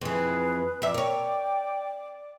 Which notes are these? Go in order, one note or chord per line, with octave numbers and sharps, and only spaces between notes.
F2 E3 G#4 B4
F2 D5 E5
A#4 C#5 G5